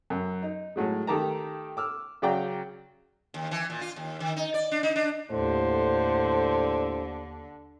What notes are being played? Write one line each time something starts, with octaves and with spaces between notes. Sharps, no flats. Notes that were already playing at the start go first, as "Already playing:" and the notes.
F#2
D#4
A2 F#3 G#3
D#3 A3 G4 A5 A#5
D6 E6 F6
C#3 F#3 D5 G5 A#5
D#2
E3
A#2
F4
D#2
D#3
D#4
D5
D4
D#4
D4
D#2 A2 D3 C5